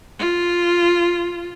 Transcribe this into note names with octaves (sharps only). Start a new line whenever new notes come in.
F4